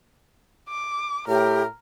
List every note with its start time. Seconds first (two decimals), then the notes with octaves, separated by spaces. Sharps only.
0.69 D6
1.28 A2 G4 A#4